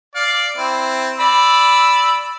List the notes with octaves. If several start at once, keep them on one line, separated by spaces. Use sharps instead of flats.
D5 F5
C4 E4
D5 B5 E6